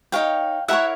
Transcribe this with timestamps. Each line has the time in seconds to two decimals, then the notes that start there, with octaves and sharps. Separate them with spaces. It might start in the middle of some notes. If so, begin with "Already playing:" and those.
0.12 D#4 G#4 C#5 F5 G5
0.68 E4 G4 A#4 C#5 E5 F#5